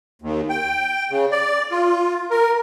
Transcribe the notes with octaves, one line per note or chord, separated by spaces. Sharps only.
D#2
G5
C#3
D5
F4
A#4